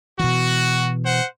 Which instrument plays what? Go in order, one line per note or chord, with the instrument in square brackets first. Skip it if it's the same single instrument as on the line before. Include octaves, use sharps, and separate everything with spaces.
[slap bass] B2 E3 [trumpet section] F#4
[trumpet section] C5 F#5